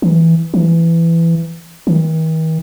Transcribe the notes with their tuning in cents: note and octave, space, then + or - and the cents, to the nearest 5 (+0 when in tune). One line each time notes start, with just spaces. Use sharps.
E3 -5
E3 +15
D#3 +45